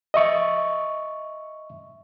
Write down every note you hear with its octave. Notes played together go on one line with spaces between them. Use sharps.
D#5 E5 C#6